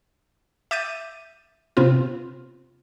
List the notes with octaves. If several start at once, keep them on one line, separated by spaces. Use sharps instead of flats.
E5 D6 G6 A6 D#7
C3 B3 C4 F4